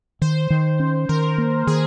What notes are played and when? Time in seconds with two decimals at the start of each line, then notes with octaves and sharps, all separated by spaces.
0.21 D#3 C5
0.50 D#3
0.80 C#4
1.09 D#3 A#4
1.38 A#3
1.67 D#3 G#4